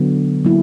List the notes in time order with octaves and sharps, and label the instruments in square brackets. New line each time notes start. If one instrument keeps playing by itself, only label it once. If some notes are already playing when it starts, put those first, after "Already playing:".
Already playing: [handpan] D3 F#3 B3
F#3 A#3 E4